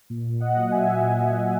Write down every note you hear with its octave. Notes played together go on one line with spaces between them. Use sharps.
A#2
D#5 F#5
F#3
E5 G#5
A#2